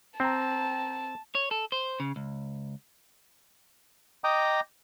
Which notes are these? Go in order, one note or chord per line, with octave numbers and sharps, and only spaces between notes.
C4 G5 A5 A#5
C#5
A4
C5
C#3
C#2
D#5 G5 A#5 D6 D#6